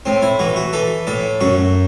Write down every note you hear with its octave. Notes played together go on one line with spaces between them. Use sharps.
A2 C4
E4
E3 F#4
F#4
E3 A4
A2 A4
F#2 F#4